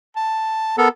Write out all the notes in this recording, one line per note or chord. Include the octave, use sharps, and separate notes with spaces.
A5
B3 A4 A#4